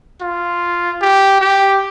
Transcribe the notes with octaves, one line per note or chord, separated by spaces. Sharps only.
F4
G4
G4